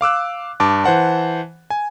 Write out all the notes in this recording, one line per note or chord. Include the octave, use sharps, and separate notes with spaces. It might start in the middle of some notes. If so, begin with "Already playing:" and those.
F5 D6 E6 F#6
G2 A5 D6
E3 C5 F#5 A5
G#5